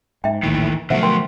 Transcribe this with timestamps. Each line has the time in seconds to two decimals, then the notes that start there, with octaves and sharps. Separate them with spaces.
0.24 G#2 E5 G5
0.43 A#1 D#2 A2 D#3 E3
0.90 B2 D3 F3 F#3 A3 C5 E5 F#5
1.03 A#4 G5 C6